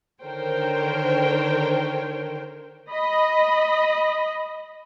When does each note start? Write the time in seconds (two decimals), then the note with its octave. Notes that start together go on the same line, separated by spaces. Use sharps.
0.21 D3 D#3 A#4 C5 C#5 G5
2.90 D#5 B5